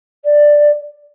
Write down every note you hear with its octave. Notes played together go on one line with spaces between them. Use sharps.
D5